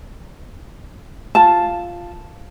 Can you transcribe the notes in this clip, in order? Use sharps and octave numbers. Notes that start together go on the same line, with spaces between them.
F4 A5